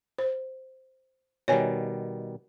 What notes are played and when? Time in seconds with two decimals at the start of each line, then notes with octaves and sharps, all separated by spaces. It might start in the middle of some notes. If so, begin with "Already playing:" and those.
0.19 C5
1.48 B2 D#3 G3 C#5 G#5